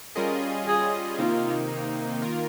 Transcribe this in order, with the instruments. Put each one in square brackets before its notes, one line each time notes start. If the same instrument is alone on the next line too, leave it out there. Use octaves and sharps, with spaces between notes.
[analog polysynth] G3 C#4 F4 G#4 D#5 [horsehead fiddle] A#4
[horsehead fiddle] G#4
[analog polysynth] C3 D#3 A#3 D#4 [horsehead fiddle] F4
[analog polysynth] D#3 A#3 F4 A#4